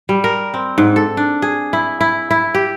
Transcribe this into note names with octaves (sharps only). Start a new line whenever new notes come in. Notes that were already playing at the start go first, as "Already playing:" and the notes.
G3
A#4
C4
G#2
A4
D4
G#4
E4
E4
E4
G4